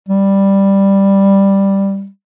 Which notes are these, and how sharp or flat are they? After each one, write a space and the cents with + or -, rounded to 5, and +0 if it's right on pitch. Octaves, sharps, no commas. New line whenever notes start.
G3 +0